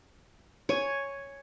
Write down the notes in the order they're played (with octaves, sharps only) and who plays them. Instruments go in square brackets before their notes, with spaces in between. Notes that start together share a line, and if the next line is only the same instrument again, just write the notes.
[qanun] C#5 G#5